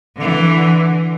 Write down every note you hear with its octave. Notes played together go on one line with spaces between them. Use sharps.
D3 E3